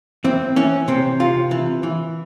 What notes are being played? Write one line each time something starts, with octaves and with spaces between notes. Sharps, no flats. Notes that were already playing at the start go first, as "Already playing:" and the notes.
E3 C4
E3 C#4
C3 C4
C3 F4
E3
E3